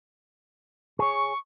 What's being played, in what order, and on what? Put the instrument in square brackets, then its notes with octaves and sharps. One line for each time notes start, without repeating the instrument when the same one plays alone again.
[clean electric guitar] G#4 C#5 [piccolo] C#6